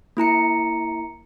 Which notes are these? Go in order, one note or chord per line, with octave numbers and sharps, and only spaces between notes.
A#3 E4 A#5 C#7